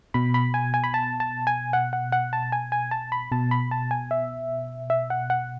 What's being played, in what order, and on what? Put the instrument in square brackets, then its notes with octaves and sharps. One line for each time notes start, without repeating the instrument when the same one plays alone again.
[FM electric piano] B2 B5
B5
G#5
G#5
B5
A5
A5
G#5
F#5
F#5
F#5
A5
G#5
G#5
A5
B5
B2 A5
B5
A5
G#5
E5
E5
F#5
F#5